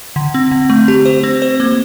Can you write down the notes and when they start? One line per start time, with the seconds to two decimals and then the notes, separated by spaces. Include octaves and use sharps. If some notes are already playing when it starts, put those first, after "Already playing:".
0.16 D3
0.34 C4
0.51 D3
0.70 A3
0.88 G4
1.05 C5
1.23 C4
1.42 C5
1.60 A#3